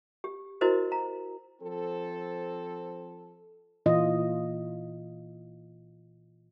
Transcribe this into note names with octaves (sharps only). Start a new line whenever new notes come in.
G4
E4 F#4 A#4 C5 D#5
A#5
F3 C4 A4
A#2 E3 F4 D#5